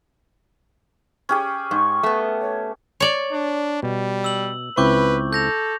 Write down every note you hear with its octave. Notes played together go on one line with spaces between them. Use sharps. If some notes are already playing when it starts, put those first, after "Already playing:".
C#4 G4 G#4
G#2 C#6
A3 B3
C#5
C#5 D5
D4
B2 G3
E6 F#7
C#2 C4 E4 B4 C#6 D6 G6
A4 G6 A#6 F7